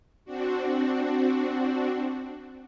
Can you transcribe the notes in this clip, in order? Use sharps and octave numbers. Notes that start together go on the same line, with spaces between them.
C4 D4 F#4